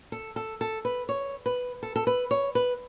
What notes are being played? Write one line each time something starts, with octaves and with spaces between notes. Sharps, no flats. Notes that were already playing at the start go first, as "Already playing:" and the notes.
A4
A4
A4
B4
C#5
B4
A4
A4
B4
C#5
B4